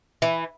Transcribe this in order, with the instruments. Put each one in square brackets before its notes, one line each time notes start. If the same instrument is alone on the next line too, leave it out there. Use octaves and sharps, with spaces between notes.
[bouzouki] E3